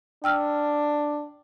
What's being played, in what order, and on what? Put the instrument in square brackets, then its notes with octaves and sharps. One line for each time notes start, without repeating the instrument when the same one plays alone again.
[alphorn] D4 [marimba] G5 E6 F6